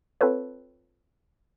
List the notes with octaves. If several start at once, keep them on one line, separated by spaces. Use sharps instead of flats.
C4 F4 A4 B4 C#5